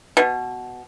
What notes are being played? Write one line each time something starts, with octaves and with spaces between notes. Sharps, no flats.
B2